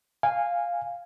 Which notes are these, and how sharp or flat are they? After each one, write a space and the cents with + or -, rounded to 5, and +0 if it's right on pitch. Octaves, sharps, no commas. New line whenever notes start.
F5 +0 G#5 -20